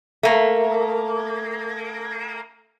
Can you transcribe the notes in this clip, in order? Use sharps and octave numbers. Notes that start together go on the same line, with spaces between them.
A3 A#3